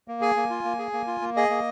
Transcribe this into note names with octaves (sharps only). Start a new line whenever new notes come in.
A#3
G#4 G#5
A#3
F4
A#3
G#4
A#3
F4
A#3
G#4 D#5
A#3